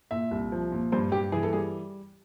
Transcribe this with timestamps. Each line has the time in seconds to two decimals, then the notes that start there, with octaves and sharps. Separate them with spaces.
0.11 A#2 E5
0.31 C2
0.52 F3
0.72 A#2
0.92 G2 C5
1.12 G2 G4
1.32 E3 G#4
1.43 A4
1.53 G3 G#4